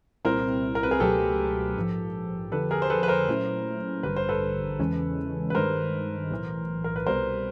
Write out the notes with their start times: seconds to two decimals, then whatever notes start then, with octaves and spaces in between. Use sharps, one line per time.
0.25 C2 A#2 G3 C4 E4 A#4 C5
0.75 A#4
0.83 B4
0.91 G#4 A#4
1.00 C#2 B2 F#3 A3 G4 A4
1.76 A#1 G#2 F3
2.52 F2 D3 F3 A4 B4
2.71 G#4 A#4
2.82 C5
2.90 A4 B4
3.03 B4
3.08 A#4 C5
3.28 A#2 F#3 A3 C#4 E4
4.03 A1 G2 D3 G3 B4
4.16 C5
4.29 A4 B4
4.79 E2 C#3 E3 G#3 C#4
5.50 B4
5.55 G2 D#3 G#3 A#4 C5
6.31 B1 A2 E3
6.84 A#4
6.96 B4
7.07 C2 B2 G3 A#4 C5